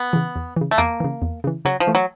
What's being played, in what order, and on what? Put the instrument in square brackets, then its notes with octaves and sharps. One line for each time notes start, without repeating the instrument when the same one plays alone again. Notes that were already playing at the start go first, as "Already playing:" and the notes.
Already playing: [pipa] B3
[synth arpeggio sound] C#3 E3
E2
C#3 E3
[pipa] A3
[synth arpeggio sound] E2 [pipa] A#3
[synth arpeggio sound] C#3 E3
E2
C#3 E3
[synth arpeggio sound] C#3 [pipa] F#3
[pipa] F3
[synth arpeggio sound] E3 A3
[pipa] F#3